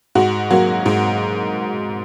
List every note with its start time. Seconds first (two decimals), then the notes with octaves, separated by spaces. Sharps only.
0.15 G#2 F#4
0.50 F#3 A#3 F#4
0.86 G#2